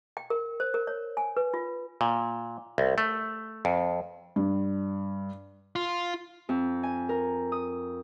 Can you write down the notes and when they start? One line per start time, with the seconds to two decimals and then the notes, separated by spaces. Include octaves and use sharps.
0.17 G5
0.30 A#4
0.60 C5
0.74 A#4
0.87 C#5
1.17 G#5
1.37 B4
1.54 F4
2.01 A#2
2.78 C2
2.98 A3
3.65 F2
4.36 G2
5.76 F4
6.49 F2
6.83 G#5
7.09 A#4
7.52 D#6